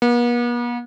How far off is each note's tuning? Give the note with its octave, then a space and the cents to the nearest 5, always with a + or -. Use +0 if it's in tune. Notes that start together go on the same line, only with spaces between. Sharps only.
B3 -45